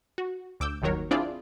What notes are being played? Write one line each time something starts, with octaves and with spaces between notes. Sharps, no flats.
F#4
D2 D6 E6 G6
G1 D#2 D#3 F#3 A#4 C#5
C4 D4 E4 F4 G#4 D5